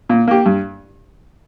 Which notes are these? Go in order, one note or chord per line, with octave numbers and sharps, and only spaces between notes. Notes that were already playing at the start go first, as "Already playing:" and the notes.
A#2
A#3 G4
G2